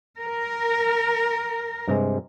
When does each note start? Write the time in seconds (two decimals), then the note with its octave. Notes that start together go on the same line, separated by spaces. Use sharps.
0.22 A#4
1.88 G2 C3 G#3